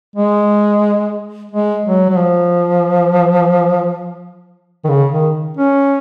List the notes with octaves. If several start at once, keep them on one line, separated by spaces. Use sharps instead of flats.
G#3
G#3
F#3
F#3
F3
D#3
C#3
D#3
C#4